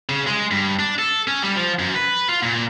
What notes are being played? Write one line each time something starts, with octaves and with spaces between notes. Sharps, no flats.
C#3
G#3
G2
D4
A4
C#4
G3
F3
F#2
B4
F4
A#2